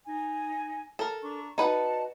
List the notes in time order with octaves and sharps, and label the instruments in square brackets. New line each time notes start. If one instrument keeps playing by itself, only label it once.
[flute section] D#4 G#5
[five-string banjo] A4 A#4
[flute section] D4 A#5 C#6
[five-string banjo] D#4 B4 F#5 [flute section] F#4 D5 A5